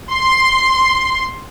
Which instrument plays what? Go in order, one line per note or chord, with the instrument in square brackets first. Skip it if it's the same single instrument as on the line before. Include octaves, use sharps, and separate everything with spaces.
[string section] C6